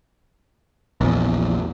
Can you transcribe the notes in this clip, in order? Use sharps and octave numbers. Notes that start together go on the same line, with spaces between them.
A#1 E2